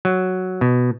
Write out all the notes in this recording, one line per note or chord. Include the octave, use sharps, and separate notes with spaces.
F#3
B2